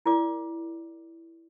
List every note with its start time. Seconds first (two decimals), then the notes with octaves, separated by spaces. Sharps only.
0.06 E4 A#4 D5 F5 D6